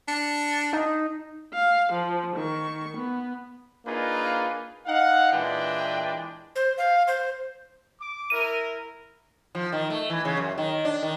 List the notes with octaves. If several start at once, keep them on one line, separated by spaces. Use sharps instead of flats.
D4 C#7
D#4
F5
F3
D#3 C#6
B3
A#3 D4 D#4 F4 G#4 B4
D#4 F5 F#5
A#2 E3 G#3 D4 B4 G5
C5
F5
C5
D6
E4 A#4 D#7
F3
D#3
A3
E3
C#3
F#2
D#3
D4
D#3